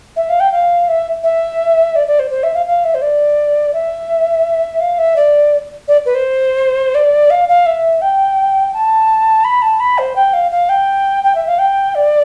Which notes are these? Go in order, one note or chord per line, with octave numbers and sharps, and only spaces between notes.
E5
F5
G5
F5
E5
E5
D5
D5
C5
C5
E5
F5
F5
E5
C5
D5
E5
F5
E5
D5
D5
B4
C5
D5
F5
F5
E5
G5
A5
B5
A5
B5
C5
G5
F5
F5
G5
G5
E5
F5
G5
D5